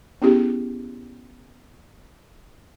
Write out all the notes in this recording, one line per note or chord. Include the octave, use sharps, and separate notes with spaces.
B3 C#4 E4 G4 G#4